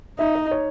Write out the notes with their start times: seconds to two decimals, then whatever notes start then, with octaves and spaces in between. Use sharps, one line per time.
0.19 D#4 E5
0.35 D#5
0.51 C#5